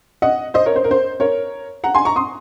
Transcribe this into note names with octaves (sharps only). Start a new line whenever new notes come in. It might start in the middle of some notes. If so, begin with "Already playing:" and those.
D#5 F#5
C5 D#5
A#4 C#5
C5
A#4
C5
A#4 C#5
F#5 A#5
G#5 C6
A#5 C#6
C6 D#6